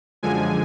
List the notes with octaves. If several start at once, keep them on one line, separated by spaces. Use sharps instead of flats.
F#2 D3 F3 G#3 G#5